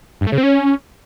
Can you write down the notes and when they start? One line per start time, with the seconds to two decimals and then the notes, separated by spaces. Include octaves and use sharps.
0.21 G2
0.27 A3
0.32 C#3
0.38 C4
0.43 C#4